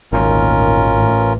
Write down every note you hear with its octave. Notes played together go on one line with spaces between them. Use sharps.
G#1 D2 A#2 D#3 C#4 F4 A#4
A1 A2 E3